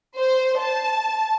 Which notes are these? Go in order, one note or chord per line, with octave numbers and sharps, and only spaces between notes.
C5
A5